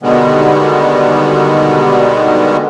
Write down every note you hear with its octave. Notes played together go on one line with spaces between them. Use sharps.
B2 D3 D#3 G3 G#3 B3